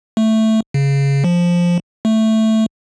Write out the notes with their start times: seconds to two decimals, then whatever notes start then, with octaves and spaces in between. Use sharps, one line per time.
0.17 A3
0.74 C#3
1.24 F3
2.05 A3